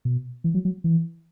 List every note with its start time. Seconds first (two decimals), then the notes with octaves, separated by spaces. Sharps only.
0.05 B2
0.44 E3
0.54 F#3
0.65 F#3
0.84 E3